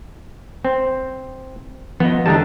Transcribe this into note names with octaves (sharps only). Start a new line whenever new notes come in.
C4
F3 B3 D#5
E2 D3 G3 G#3 A5 A#5